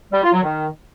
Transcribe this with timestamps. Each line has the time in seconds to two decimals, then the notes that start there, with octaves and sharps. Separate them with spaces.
0.12 G3
0.23 F4
0.33 F#3
0.43 D#3